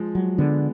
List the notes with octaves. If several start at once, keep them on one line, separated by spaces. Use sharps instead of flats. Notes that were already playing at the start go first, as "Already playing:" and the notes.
Already playing: F3 G#3
F#3
D3 G#3 B3